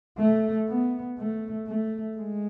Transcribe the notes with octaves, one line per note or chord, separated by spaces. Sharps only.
A3
B3
A3
A3
G#3